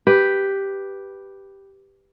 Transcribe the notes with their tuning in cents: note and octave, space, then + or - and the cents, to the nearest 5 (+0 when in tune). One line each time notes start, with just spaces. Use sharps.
G4 +0 B4 +0